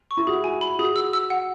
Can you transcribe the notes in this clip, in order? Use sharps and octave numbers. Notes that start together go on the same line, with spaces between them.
C#6
E4
F#4 G#4
G#5
B5
F#4 G#4
E6
E6
F#5